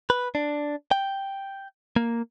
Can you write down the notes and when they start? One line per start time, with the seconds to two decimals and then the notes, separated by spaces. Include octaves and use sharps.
0.10 B4
0.35 D4
0.91 G5
1.96 A#3